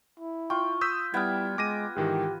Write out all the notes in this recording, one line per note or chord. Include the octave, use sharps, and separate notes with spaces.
E4
F4 G5 C#6
D#6 E6 G6 B6
G3 B3 E4 G5 F6 G#6
G#3 D6 A#6 D#7
G#2 D#3 E3 G4